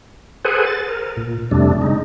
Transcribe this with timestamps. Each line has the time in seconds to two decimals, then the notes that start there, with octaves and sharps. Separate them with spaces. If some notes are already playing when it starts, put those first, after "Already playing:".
0.45 G#4 A4 B4 C5 F#5 G#5
0.66 A6
0.89 A#4
1.17 A#2
1.51 F2 C3 G3 A3 D4
1.82 C#3 G#3 D#4